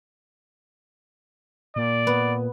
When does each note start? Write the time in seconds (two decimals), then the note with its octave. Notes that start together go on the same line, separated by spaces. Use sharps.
1.76 A#2 D5
2.07 B3